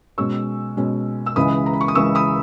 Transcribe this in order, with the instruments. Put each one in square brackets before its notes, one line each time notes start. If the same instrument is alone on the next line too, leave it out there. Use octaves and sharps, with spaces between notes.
[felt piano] B2 G#3 C#4 C#6 E6
B2 G#3 C#4
E6
C#2 C#3 E3 G#3 B5 D#6
A#5
B5
C#6
D#6
C#2 C#3 E3 G#3 C#6 E6
B5 D#6